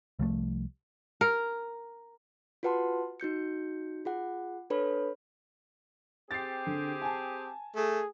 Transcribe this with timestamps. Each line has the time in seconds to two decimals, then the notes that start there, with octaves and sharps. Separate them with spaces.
0.19 C2 F3 A3
1.21 A#4
2.63 F4 F#4 B4 F#5 A5 C6
3.20 D#4 F#4 G6 C#7
4.05 F4 G#4 F#5
4.70 D4 A4 B4 C#5 B5
6.31 C4 G4 G#4 A6 C7
6.67 D3
7.02 G#5 A5
7.76 A3 G#4